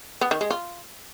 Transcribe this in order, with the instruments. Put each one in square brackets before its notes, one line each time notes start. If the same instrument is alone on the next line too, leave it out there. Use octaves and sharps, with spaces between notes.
[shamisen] B3
D#3
G#3
F4